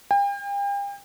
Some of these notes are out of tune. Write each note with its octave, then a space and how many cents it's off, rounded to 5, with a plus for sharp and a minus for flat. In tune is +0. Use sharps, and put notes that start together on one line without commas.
G5 +40